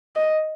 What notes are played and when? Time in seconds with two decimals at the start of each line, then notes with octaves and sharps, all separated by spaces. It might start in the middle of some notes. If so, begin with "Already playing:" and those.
0.16 D#5